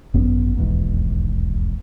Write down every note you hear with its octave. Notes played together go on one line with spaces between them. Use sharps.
G#1 F#2 B3
D#1 B1 E2 G#2